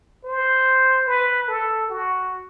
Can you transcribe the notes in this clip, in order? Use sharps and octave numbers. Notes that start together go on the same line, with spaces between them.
C5
B4
A4
F#4